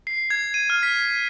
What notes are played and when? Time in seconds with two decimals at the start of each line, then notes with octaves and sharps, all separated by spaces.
0.07 C7
0.30 G#6
0.54 D#7
0.70 F6
0.83 B6